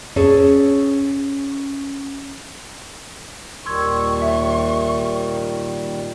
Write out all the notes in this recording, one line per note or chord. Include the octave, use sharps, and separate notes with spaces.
C#4 G#4 A4 C#5
D#2 A#2 D#3 G3 C6 C#6 E6 G#6
E5